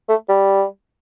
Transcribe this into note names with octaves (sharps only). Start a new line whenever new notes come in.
A3
G3